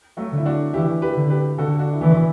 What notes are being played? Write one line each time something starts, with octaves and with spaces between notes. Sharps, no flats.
F#3 A3
D3
E4
D4 F#4
E3 E4 G4
G4 B4
D3
G4 B4
D3 F#4 A4
D4 F#4
E4
E3 B3 D4